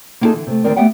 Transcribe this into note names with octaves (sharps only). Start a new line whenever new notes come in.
A#3 B3 D#4 F4 G#4 A4
D3 E3
C3 A3
D2 D#3 G3 C4 A#4 D5
A3 B3 G4 E5 F#5 G5